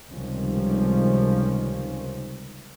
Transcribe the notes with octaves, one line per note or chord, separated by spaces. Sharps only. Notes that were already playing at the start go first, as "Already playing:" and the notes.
C#2 C3 D#3 F3 G3 C#4